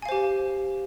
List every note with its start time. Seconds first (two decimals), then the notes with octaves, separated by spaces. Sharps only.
0.02 G#5
0.06 F5
0.09 C5
0.12 G4